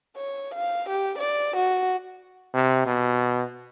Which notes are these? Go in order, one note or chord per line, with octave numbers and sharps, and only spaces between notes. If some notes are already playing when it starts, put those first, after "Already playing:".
C#5
F5
G4
D5
F#4
C3
B2